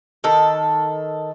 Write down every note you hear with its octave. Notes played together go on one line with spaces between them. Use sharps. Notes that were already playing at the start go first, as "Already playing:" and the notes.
D#3 A4